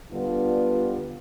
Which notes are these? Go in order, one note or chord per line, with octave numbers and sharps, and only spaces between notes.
D3 G3 B3 D4 F4